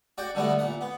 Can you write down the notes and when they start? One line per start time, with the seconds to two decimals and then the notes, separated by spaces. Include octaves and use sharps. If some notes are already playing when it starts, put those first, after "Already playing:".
0.18 F#4 D5 G5
0.35 D3 G3 A3 B3 F#4
0.59 A#2 F#5
0.81 B3